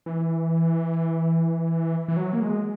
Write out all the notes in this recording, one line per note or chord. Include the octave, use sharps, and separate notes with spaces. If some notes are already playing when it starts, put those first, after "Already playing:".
E3
E3
F#3
A#3
G#3